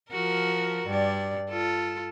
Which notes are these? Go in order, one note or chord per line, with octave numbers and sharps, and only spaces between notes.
F3 F#4 A#4
G2 D5
F4 A4